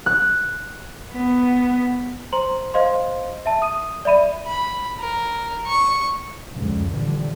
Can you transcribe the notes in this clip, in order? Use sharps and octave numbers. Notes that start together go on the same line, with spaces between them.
F#6
B3
C5 A#5 C6 F#7
C5 D#5 F5 C6
E5 A5
D#6 D#7
D5 E5 B5 D#7
B5
A#4
C#6
F1 C#2 F#2 D3 F3
A#2 D3 E3 F3 G3